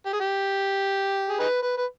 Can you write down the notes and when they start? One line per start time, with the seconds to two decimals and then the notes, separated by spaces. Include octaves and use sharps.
0.05 G4
0.13 G#4
0.20 G4
1.29 G#4
1.40 D#4 G#4 B4
1.63 B4
1.77 B4